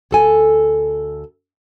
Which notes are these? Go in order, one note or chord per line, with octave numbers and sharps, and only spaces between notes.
D2 A4 G#5